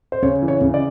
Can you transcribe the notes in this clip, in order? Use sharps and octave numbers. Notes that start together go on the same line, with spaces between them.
C5
C#3 C#5
E3
C#5
C#3
D5